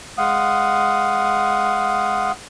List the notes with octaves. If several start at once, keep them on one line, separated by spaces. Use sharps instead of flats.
G#3 F5 F#5 D#6